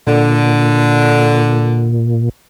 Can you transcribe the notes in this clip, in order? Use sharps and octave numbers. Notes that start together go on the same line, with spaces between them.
A#2 D3